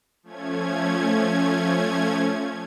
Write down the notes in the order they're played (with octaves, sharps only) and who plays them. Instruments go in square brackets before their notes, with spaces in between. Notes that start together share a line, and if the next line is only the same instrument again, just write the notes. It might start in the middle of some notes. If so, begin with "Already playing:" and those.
[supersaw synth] F3 A3 C#4 G#6